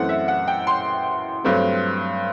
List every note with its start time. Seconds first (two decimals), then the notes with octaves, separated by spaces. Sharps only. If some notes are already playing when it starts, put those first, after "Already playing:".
Already playing: F#2 E3 A3 C4 F#5
0.09 E5
0.28 F#5
0.48 G5
0.67 C6
1.44 G2 F#3 A3 C4